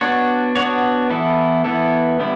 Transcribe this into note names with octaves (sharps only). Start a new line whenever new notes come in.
B3 D4 F#4 C#5
B3 D4 F#4 C#5
E3 B3 E4 A4
E3 B3 E4 A4
D3 G3 B3 E4